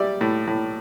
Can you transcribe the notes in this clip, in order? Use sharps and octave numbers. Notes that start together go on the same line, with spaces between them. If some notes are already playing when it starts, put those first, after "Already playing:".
Already playing: G3 D5 E5
A2
A2